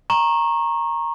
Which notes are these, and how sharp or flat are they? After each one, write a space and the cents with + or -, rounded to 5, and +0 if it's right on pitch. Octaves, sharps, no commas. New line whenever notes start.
A#5 +0 C#6 -25